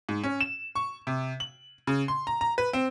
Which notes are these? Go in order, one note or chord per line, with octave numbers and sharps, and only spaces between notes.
G#2
C#4
E7
C#6
C3
F#7
C#3
C6
A#5
A#5
B4
C4